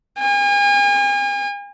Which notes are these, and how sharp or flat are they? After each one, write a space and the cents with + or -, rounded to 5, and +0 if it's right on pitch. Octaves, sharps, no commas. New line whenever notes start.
G#5 -40